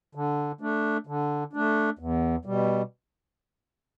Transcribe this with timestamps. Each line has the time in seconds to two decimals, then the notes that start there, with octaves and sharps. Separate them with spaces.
0.15 D3
0.61 A3 D4
1.07 D3
1.53 A3 D4
1.99 E2
2.45 B2 G3